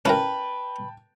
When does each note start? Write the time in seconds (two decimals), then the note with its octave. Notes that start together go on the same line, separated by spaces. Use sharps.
0.05 C#4 E4 A#4 B4 G5 A5